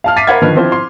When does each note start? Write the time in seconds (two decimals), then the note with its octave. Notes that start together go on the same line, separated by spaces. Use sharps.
0.04 F5 A5 F6
0.16 E5 D6 A6 B6 C7 D#7
0.27 A#4 C5 F5 F#5 B5 G#6
0.42 D3 D#3 F3 B4 F6
0.55 F3 C4 E4 C5
0.72 C6